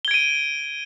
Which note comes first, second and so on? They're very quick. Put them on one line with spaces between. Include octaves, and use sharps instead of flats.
G7 G#6 D7 D#7